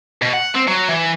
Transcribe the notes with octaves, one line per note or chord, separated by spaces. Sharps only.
B2
F#5
C4
F#3
E3